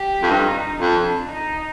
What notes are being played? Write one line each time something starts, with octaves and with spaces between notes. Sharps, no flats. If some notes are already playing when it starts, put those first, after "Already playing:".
Already playing: G4
F2
G2 D#4
F2 D4
D#4